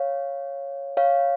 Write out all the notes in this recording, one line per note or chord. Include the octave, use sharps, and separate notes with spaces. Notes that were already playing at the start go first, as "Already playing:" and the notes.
Already playing: C#5 F5
C#5 F5